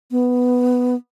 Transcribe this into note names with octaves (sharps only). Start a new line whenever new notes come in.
B3